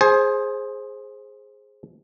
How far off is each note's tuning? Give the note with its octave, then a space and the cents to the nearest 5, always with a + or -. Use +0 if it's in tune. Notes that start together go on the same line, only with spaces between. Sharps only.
G#4 +0 C5 +15 G#5 +30